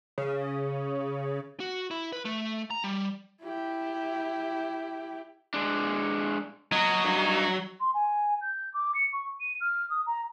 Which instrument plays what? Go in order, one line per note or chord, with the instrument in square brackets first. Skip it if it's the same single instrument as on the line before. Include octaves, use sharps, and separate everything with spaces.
[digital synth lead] C#3
[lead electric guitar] F#4
E4
B4
A3
A#5
G3
[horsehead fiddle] E4 G4
[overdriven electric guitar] G#3 D4
[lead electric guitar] F#3 [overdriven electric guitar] F#4 D#5
[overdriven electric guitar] G2 D#4
[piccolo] C6
G#5
G6
D6
C#7
C#6
D#7
F6
D#6
A#5